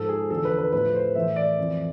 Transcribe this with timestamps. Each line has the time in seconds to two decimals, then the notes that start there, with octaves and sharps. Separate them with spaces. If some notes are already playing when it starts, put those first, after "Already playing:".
Already playing: G#2 F3 A4
0.09 G#4
0.30 E2 D3 F3 A4
0.45 B4
0.58 B4
0.72 A2 F3 B4
0.95 C5
1.15 A2 E3 E5
1.36 D5
1.58 F2 E3